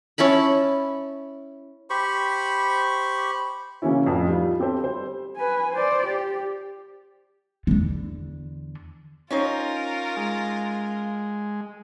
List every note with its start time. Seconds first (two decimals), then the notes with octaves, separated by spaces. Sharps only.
0.18 C#4 E4 A5 B5
1.90 G4 C5 B5 C#6
3.82 C#3 E3 A#3 C#4 E4
4.06 A1 F2
4.28 G3 D#4 F4
4.60 C4 G4 A4 C5
4.84 G3 C5
5.36 B4 G#5
5.73 C5 D5
6.07 G4
7.67 E2 D3
9.31 C#4 D#4 F4 A#4 C5
10.17 G#3